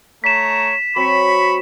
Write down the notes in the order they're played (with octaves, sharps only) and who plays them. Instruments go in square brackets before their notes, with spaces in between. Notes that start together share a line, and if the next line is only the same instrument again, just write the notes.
[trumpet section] A3 C#5 A#5 [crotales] B6 E7
[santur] F#3 C4 G5 [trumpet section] B5 C#6